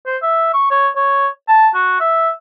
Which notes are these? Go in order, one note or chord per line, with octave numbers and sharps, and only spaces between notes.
C5
E5
C#6
C#5
C#5
A5
F#4
E5